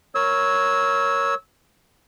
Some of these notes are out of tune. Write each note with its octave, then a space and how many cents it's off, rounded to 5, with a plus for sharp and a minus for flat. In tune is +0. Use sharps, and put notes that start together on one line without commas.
A#4 +0 C#5 +0 E6 -20